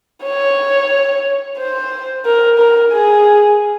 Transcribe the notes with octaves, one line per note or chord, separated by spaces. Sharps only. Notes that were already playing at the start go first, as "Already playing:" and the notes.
C#5
C5
A#4
A#4
G#4